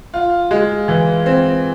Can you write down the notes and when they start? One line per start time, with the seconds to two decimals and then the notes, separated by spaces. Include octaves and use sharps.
0.14 F4
0.51 G#3
0.88 E3
1.26 C4